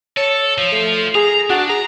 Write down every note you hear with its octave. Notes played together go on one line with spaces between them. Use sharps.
A4 C#5
F3 F4
A3
G#4 A#5
D4 F#4
G#4 A#5